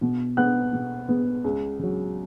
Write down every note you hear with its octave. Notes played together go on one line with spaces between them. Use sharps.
B2
B3 F#5 F#6
B2
B3
C#2
C#3 F#3